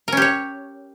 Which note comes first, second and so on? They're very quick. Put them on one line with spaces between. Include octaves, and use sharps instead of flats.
A#4 C#4 G4 C#5